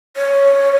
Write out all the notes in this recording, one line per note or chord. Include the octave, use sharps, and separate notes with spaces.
C#5